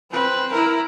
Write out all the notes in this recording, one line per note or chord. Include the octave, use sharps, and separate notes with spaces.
C4 B4
E4 A#4